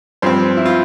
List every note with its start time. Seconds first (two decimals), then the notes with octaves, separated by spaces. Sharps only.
0.22 G2 F3 C4 C5
0.57 E4
0.66 F4